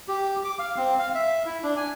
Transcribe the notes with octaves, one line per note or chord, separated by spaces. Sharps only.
G4
D6
F5
C4
F5
E5
E4
D4
G#5